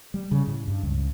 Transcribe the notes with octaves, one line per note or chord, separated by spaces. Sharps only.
G3
C#3
A2
G2
C#2